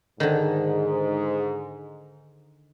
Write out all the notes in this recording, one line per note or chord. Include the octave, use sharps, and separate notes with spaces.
G#2 D3 D#3